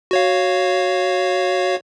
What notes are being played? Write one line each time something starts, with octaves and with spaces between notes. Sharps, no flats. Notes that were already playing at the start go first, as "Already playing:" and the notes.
F#4 C#5 F5